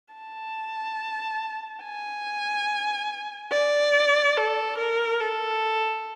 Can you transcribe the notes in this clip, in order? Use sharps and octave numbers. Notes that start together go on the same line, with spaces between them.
A5
G#5
D5
A4
A#4
A4